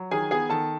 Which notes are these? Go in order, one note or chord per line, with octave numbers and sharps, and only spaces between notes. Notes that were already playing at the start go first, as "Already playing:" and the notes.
Already playing: F#3
D#3 G#4 G#5
B3 G#4 G#5
D#3 A4 A5